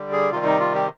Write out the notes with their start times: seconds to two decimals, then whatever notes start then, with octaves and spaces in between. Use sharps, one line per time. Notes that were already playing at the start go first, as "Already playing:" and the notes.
Already playing: D3 G3
0.13 G#4
0.31 C3 D#3 G3 F4
0.45 D#4
0.60 F4
0.75 G4